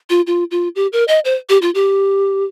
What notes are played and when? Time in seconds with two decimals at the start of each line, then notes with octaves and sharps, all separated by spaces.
0.10 F4
0.27 F4
0.51 F4
0.76 G4
0.93 A#4
1.08 D#5
1.25 C5
1.49 G4
1.62 F4
1.75 G4